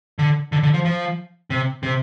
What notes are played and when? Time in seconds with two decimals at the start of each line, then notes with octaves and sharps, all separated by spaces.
0.19 D3
0.52 D3
0.63 D3
0.74 F3
0.85 F3
1.50 C3
1.83 C3